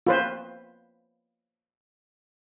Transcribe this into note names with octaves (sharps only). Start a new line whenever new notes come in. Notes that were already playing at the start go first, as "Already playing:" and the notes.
F4 B4 C5